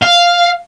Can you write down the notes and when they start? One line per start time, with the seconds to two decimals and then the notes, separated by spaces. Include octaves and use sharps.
0.02 F5